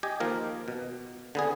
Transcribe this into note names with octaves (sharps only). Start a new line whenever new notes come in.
G4 D#5 G#5
D#3 F3 A#3 A#4
B2
D3 B3 G#4